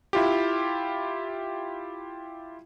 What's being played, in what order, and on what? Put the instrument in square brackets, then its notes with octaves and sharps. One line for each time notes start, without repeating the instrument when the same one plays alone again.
[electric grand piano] E4 F4 G4